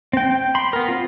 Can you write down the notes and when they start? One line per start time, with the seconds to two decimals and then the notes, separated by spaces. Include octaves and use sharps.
0.13 C4 G5
0.30 G5
0.55 B5 C6
0.73 B3 A#4
0.89 C4 F4